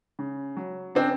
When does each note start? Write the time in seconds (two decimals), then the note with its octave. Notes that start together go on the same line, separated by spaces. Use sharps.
0.19 C#3
0.57 F#3
0.95 C#3 C4 D4